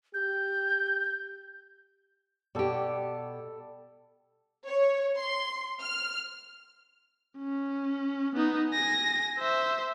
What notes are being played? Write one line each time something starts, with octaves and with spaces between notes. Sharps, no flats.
G4 G6
B2 G3 G4 A4
C#5
C6
F6
C#4
B3 D#4
G#5 A#6
C5 E5